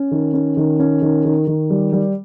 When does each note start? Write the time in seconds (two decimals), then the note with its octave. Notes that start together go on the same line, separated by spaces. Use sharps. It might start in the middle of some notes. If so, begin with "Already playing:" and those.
Already playing: C#4
0.11 D#3
0.34 C#4
0.57 D#3
0.80 C#4
1.02 D#3
1.25 D#3
1.47 D#3
1.70 G3
1.93 G3